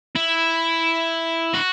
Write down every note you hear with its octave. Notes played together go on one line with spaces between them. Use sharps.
E4
F#4